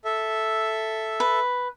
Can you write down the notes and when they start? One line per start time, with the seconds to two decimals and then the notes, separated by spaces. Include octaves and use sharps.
0.05 A4 E5
1.20 B4